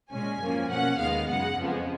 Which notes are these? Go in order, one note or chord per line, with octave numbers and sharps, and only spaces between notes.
A#2 G#3 C#4 G#5
F#2 F3 A#3 C#4
B2 A#3 C#4 F#5
D#2 D#3 G#3 B3 F5
F#2 C#3 G#3 F#5
F2 C#3 F3 G#3 B3